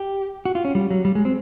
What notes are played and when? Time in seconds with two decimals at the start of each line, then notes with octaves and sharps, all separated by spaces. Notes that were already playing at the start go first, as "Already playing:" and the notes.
Already playing: G4
0.45 F#4
0.55 F4
0.65 C#4
0.75 G3
0.90 F#3
1.05 G3
1.15 G#3
1.25 C4